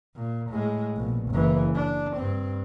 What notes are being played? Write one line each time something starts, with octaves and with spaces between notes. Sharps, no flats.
A#2
A2 G#3
A#1 B2
F#1 E3
D4
G2 C4